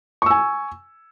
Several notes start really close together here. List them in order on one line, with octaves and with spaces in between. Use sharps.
C#6 E6 G#5